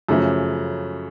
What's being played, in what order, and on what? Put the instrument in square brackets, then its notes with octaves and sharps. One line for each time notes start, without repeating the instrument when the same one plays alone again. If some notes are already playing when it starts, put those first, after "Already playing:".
[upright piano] F#2 C#3 F3 A3 C#4